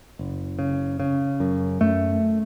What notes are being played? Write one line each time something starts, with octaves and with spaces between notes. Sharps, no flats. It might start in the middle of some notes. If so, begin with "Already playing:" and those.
F#1
C#3
C#3
F#2
F#2 A3